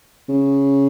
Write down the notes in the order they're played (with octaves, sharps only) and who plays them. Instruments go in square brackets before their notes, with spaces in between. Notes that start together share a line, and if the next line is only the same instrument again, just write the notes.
[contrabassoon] C#3